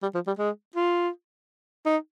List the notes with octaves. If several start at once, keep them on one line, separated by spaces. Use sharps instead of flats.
G3
F3
G3
G#3
F4
D#4